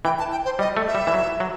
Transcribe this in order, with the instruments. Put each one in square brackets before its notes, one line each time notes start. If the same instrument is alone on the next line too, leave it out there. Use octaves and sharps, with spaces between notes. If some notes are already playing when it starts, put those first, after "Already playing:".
[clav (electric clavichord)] E3 [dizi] G5
[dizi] A5
G5
C5
[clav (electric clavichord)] G3 [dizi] D#5
[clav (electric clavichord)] A3
[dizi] E5
[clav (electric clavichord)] G3
E3
F#3
F#3